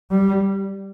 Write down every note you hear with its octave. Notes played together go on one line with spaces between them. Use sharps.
G3